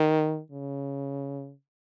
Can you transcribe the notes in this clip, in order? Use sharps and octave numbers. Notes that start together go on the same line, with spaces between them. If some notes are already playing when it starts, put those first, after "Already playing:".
Already playing: D#3
C#3